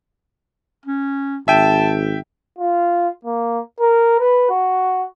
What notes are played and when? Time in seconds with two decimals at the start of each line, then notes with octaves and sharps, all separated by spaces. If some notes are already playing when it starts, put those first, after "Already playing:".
0.86 C#4
1.48 G#1 E5 G5 A5
2.59 F4
3.25 A#3
3.80 A#4
4.20 B4
4.50 F#4